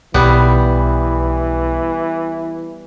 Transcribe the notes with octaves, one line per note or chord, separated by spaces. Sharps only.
B1 E3 G3 B3